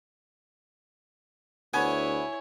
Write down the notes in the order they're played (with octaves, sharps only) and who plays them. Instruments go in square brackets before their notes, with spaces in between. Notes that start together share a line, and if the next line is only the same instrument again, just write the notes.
[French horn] D2 [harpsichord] B3 [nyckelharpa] E4 C#5 [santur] G#5